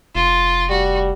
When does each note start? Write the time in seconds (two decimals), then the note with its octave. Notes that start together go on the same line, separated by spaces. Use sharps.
0.15 F1 F4
0.70 G3 F#4